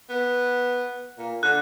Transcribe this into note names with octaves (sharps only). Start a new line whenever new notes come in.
B3
A#2
D3 F#6